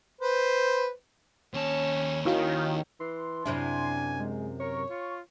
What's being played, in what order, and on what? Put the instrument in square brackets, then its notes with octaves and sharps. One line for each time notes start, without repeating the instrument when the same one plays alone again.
[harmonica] B4 C5
[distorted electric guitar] D#2 A5 [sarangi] C#4
[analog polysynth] D#3 [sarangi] C#4 [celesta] E4 F#4 F5
[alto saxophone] E3 [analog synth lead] C6
[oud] F#2 C3 E4 [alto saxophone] D4 [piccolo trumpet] G#5
[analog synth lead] G#3
[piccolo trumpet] A#4 [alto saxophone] C#5 [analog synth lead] C#6
[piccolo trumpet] F4